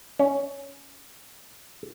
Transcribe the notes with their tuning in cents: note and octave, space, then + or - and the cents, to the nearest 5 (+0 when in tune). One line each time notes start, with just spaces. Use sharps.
C#4 +10